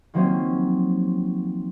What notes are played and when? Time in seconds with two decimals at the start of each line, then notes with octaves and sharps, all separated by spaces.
0.14 D#3 F3 F#3 A#3 C4 C#4